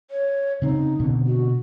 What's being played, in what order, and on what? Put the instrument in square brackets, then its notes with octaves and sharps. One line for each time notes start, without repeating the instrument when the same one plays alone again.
[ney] C#5
[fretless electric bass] C#3 C4 [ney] D#4
[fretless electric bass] B2 D3 C4
[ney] F#4